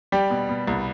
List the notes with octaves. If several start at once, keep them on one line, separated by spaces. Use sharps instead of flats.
G3 G4
B2
B2
C2